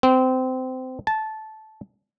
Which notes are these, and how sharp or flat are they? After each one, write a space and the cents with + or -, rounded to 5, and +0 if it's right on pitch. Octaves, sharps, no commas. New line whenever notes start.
C4 -20
A5 -15